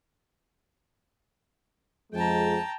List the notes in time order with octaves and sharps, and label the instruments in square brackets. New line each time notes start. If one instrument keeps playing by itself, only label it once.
[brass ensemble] F2 F3 G#3 [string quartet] G5 A5 A#5